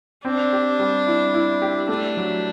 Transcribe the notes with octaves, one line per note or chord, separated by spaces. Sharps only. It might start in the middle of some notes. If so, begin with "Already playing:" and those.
C4 D4
G4
G3
E4
E4
G4
A3 D4
F#3